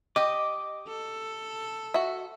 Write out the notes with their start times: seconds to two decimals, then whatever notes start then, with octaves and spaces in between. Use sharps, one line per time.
0.16 G4 D#5 D6
0.88 A4
1.94 F#4 E5